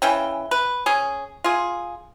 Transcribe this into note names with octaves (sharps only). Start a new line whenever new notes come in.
C#3 E3 C#4 G5
B4
C#4 G#4
F4 G#4